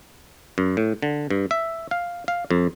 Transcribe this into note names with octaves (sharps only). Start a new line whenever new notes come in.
F#2
A2
D3
G2
E5
F5
F5
F2